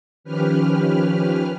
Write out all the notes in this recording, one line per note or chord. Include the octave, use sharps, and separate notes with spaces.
D#3 F3 C#4 G4 B4 F6